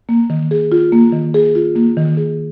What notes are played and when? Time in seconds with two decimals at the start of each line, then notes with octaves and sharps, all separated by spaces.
0.09 A#3
0.30 D#3
0.51 G#4
0.72 F4
0.92 A#3
1.13 D#3
1.34 G#4
1.55 F4
1.75 A#3
1.97 D#3
2.17 G#4